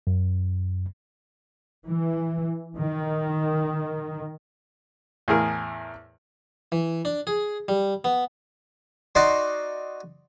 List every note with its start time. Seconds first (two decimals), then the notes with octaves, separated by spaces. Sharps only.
0.07 F#2
1.86 E3
2.78 D#3
5.28 E2 A2 G#4 A#4
6.72 E3
7.05 D4
7.27 G#4
7.68 G3
8.04 B3
9.15 D#4 F#4 D5 C6